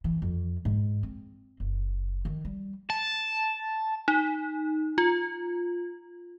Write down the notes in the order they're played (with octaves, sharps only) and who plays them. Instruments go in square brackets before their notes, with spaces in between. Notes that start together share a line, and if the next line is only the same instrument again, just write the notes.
[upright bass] E3
F2
G#2
C4
F#1
D#3
G3
[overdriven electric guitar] A5
[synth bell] D#4
F4